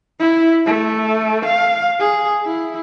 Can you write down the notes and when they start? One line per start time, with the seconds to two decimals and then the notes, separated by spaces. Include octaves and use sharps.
0.19 E4
0.66 A3
1.45 F5
1.99 G#4
2.45 E4